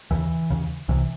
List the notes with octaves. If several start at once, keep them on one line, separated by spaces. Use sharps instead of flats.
D#2 C#3 E3
D#2 C#3
C2 C3 E3